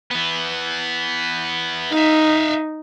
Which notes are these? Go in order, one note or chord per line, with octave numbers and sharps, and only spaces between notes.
E3 B3
D#4 E5 F5